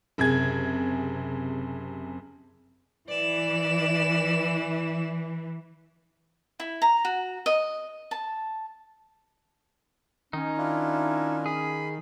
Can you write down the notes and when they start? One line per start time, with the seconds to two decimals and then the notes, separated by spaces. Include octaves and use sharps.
0.18 F#1 C3 G#4 G#6
3.09 E3 D5 E7
6.60 E4
6.82 A#5
7.05 F#4
7.46 D#5
8.11 A5
10.33 D#3 C#4 D#4
10.57 D4 E4 F4
11.46 G#4 B5